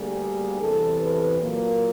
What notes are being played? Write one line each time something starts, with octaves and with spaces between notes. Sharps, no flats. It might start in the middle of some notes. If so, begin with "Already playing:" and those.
Already playing: D2 D3 G3 A#3 G#4
E2 C3 E3 A4
B4
A#2 F#3 A#3